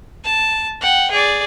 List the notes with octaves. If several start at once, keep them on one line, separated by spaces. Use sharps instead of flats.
A5
F#5 G5
G#4 D5